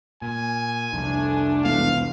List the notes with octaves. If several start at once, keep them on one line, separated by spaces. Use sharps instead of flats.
A#2 G#5
C2 F2 A3 D4
E1 F5